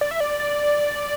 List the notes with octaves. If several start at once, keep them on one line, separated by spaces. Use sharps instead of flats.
D5
E5
D5
D5